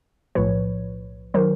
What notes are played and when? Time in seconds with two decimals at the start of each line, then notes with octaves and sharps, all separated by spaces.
0.35 B1 A2 F3 B4 C#5
1.34 D#3 F#3 A#4 C5